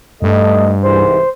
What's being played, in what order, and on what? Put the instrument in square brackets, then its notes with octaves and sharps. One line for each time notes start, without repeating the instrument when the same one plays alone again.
[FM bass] G2 [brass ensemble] A3 A4 D#5
[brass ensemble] C2 G#2 E3 [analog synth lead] C5